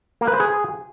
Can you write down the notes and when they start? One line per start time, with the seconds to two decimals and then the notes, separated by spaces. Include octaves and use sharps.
0.21 A#3
0.27 B4
0.34 C5
0.40 G#4